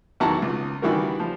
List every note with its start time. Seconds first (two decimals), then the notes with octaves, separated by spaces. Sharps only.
0.20 E2 D#3 F#3 F#4 A5 A#5
0.42 C#2
0.82 D#3 E3 G3 F#4 A#4
1.19 F3